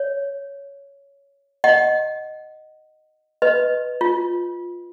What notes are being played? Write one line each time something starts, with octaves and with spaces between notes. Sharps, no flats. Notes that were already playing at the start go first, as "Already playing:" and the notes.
Already playing: C#5
D#5 F#5
B4 D#5
F4